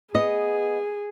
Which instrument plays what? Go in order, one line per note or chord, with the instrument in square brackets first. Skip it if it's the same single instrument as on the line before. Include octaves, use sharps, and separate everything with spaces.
[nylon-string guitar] B3 D#5 [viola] G#4